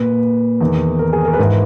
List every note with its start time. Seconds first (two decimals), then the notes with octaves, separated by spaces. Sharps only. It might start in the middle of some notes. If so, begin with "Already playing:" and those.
Already playing: A#2 B4
0.61 E2 D#3
0.99 A#4
1.13 G#4
1.25 A#4
1.33 B4
1.38 G#2 E3 A#4